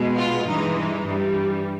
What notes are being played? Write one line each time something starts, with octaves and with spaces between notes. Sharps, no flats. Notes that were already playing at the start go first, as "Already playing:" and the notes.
Already playing: B2 G#3
F4
G2 E3 G#3 D#4
D#4
G2 E3 G3